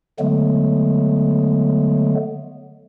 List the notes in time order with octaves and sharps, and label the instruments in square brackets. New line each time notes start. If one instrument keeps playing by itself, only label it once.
[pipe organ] D3 F#3 G#3 A3 B3